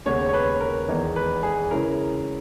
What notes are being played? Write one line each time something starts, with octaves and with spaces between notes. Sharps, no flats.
D#2 C#3 G#3 B3 C#5
C#5
B4
A#4
E2 D#3 G#3 D#4
B4
G#4
C#3 G#3 C#4 E4 A#4